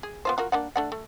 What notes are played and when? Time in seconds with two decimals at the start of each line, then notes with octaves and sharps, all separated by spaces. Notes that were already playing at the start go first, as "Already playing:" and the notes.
0.03 G#4
0.25 B3 F4 C5
0.38 F4 F#4 A#4
0.52 A#3 D4 F#5
0.76 A3 D4 F#5
0.92 A3